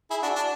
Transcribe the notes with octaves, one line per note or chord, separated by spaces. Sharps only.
E4 G#4
D4 F#4
D4